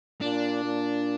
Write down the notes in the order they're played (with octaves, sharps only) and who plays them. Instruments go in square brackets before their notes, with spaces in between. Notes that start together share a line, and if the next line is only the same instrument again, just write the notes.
[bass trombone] A#2 [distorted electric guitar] D4
[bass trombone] A#2